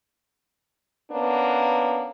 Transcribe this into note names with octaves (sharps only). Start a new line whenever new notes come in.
A#3 B3 C#4 D4